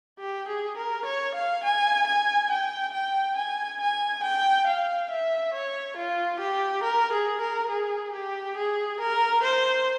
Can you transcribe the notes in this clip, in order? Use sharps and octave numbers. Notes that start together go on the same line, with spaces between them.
G4
G#4
A#4
C#5
F5
G#5
G#5
G5
G5
G#5
G#5
G5
F5
E5
C#5
F4
G4
A#4
G#4
A#4
G#4
G4
G#4
A#4
C5